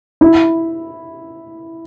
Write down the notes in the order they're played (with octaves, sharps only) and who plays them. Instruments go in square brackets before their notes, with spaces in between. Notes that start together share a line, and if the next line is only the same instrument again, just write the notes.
[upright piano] E4